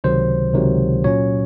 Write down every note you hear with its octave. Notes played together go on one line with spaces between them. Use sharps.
C#2 C3 D#3 F#3 C5
C#2 C3 D#3 F#3
A#2 F#3 C#4 C#5